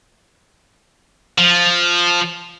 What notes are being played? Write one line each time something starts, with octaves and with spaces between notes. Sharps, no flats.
F3